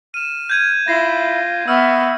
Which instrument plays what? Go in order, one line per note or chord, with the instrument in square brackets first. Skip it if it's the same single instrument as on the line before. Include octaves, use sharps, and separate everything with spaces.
[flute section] F6 [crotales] D#7 E7
[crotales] G6 G#6 D#7
[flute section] E4 E5 B5 [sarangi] F4 [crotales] A#6 C7
[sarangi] B3 [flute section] E5 B5 C#6 [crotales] E6 F6